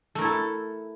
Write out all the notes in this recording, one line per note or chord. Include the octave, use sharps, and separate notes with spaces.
A3 E4 A4 A#4